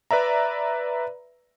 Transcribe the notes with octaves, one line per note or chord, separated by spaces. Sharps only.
B4 D5 E5 A#5